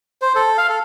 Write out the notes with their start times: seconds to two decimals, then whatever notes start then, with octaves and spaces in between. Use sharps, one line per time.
0.22 C5
0.35 A4
0.58 F5
0.69 A4